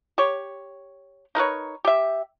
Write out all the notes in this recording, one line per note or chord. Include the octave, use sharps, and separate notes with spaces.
G4 C#5
D#4 A#4 B4 C#5
G4 E5